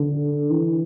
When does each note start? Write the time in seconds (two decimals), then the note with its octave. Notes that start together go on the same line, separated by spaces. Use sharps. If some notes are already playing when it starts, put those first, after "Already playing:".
Already playing: D3
0.51 E3